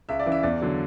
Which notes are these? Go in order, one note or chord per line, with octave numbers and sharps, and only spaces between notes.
C#2 E5
D5
C#3 E3
E5
E2 D5
D3 F#3